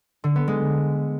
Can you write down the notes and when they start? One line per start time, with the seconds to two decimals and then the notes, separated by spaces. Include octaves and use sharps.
0.24 D3
0.36 B3
0.48 G#3